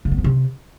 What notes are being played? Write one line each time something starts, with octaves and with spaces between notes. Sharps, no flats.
C#3
B3
F2
C3